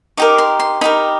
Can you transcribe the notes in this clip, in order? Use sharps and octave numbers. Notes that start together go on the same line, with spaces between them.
D#4 G4 A#4 D6
C6
C6
D#4 G4 A#4 B5